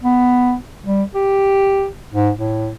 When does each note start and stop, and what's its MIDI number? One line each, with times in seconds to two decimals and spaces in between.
0.03 0.55 59
0.86 1.03 55
1.15 1.87 67
2.13 2.30 44
2.37 2.71 45